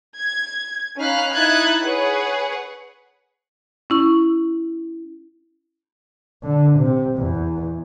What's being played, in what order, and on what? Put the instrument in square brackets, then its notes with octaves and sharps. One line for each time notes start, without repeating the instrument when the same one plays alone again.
[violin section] G#6
C#4 D#4 F5 B5 F6 F#6
D#4 E4 E5 F#6 G#6 A6
G#4 B4 C#5 F#5
[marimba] C#4 E4 C#6
[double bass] D3
C3
E2